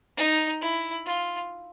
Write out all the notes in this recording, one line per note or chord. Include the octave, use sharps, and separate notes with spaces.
D#4
E4
F4